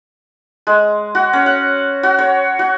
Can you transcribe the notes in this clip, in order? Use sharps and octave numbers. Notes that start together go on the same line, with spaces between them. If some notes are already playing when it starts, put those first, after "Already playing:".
G#3
F#4
C#4
F#5
F#4
C#5
F#4